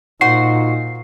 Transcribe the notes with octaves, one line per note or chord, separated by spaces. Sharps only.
A#2 D#4 F#4 C5 F#5 C7